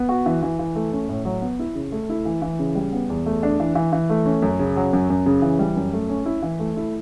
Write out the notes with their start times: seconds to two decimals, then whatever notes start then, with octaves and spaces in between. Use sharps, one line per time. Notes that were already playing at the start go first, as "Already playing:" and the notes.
Already playing: B3
0.09 F#4
0.26 E3
0.43 E3
0.59 E3
0.75 A3
0.93 C#4
1.09 A2
1.25 F#3
1.42 B3
1.59 E4
1.75 C#3
1.92 A3
2.10 E4
2.25 E3
2.42 E3
2.59 C#3
2.75 G3
2.92 B3
3.10 E2
3.26 A3
3.43 D4
3.60 E3
3.75 E3
3.93 E3
4.10 A3
4.26 C#4
4.42 F#2
4.59 C#3
4.76 F#3
4.93 F#2
5.10 F#2
5.26 C#3
5.42 E3
5.59 G3
5.76 F#2
5.93 A3
6.09 C#4
6.26 E4
6.43 E3
6.59 A3
6.77 E4